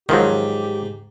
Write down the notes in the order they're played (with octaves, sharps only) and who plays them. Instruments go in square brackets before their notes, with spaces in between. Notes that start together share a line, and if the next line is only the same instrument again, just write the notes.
[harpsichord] G#2 [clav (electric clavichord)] D#3 F3 F#3 [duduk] G4